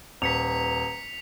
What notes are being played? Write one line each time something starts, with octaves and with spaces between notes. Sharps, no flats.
D#1 B4 A#5 B6 C#7 F7